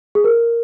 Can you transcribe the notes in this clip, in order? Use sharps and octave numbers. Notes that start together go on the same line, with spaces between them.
G#4
A#4